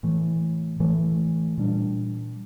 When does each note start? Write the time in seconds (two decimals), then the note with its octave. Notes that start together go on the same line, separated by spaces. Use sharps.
0.03 A2 E3 A3
0.80 A2 E3 A3
1.58 A#2 G3 D4